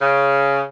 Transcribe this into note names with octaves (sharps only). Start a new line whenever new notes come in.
C#3